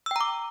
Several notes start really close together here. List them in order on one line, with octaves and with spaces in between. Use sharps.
E6 G5 A#5 D6